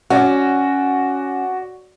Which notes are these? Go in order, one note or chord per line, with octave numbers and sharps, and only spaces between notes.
C#4 F#4 D5